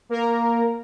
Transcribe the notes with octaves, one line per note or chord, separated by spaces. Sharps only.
A#3 A#4